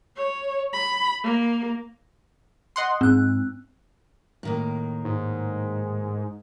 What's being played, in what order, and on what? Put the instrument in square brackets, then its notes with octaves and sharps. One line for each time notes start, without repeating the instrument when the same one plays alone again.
[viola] C#5
B5
A#3
[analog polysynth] D#5 F#5 C6
[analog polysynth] G#2 [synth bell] C4 F#6
[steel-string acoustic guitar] A2 D#3 A#3
[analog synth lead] G#2